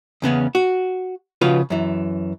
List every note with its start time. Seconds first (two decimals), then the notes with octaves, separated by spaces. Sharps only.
0.22 E2 C#3 B3 C#4
0.55 F#4
1.42 C#3 F3 F4 F#4 B4
1.70 F#2 E3